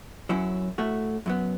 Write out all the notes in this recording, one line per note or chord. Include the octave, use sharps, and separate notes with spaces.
F#2 F#3 C#4 E4
A2 A3 F#4
F#2 F#3 B3